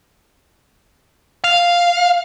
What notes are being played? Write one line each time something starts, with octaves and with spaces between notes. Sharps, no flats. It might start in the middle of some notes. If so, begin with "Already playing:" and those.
F5